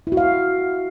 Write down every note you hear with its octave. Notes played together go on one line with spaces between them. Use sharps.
E4
F#4
F5